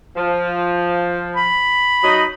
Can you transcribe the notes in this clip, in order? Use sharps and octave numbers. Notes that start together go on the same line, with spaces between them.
F3
B5
F#3 D#4 D#5